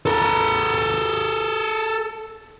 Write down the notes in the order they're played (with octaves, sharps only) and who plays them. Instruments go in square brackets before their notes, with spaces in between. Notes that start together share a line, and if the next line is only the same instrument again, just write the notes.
[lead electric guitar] A4 A#4